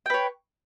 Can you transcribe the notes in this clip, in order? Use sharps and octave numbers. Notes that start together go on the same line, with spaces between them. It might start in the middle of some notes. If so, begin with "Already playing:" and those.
B4 C#5 G5